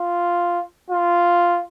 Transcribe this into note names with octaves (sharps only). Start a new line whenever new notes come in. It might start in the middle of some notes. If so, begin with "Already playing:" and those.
Already playing: F4
F4